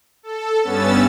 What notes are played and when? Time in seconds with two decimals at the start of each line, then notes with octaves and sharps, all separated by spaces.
0.23 A4
0.62 G2 B3 C#4 E6 A6